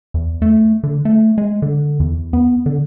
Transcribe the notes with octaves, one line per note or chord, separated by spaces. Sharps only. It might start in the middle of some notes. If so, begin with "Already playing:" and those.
E2
A3
D3
A3
G#3
D3
E2
B3
D3